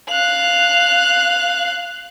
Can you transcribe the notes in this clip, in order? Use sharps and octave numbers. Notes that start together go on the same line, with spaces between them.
F5 F#6